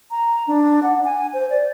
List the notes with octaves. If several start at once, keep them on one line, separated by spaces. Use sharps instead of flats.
A#5
D4
F#5
G#5
C5
D5